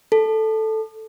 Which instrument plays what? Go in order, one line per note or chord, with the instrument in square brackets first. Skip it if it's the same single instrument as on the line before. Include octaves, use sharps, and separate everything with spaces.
[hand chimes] A4